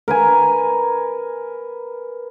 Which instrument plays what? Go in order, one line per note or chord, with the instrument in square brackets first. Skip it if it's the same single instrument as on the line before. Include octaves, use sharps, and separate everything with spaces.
[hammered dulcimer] A#4 B4 G#5